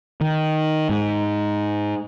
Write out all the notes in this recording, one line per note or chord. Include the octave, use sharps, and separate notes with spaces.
D#3
G#2